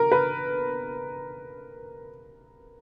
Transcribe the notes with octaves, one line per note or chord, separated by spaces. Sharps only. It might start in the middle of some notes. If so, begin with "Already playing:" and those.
Already playing: A#4
B4